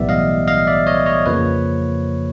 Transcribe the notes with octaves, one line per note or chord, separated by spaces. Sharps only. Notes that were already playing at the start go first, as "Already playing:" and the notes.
Already playing: B1 A2 E3 G3 B3 D5 E5
D#5 F5
D#5 F5
D5 E5
C#5 D#5
C#5 D#5
F2 C#3 F3 A#3 B4 C#5